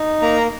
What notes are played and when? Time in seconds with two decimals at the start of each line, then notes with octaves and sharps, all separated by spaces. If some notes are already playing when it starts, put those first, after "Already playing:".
Already playing: D#4
0.22 A#3 A#5